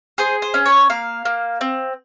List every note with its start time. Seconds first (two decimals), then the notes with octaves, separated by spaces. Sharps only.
0.18 G#4 C5
0.42 C5
0.54 C#4
0.66 C#5
0.90 A#3 F5
1.25 A#3
1.61 C4